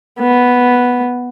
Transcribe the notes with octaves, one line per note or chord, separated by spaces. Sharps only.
B3